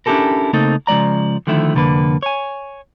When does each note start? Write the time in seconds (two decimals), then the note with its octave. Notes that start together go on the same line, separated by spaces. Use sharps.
0.06 C#4 D4 E4 G4 A4 A#4
0.53 C#3 A3 A#3 C4 D#4 A4
0.87 C#3 F3 G#3 D5 A#5
1.47 D3 D#3 F3 A3 E4
1.74 C2 F2 D3 A#3 B4
2.23 C#5 G#5